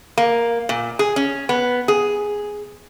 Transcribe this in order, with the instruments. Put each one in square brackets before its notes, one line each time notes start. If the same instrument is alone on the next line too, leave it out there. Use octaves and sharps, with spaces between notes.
[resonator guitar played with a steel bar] A#3
A#2
G#4
C#4
B3
G#4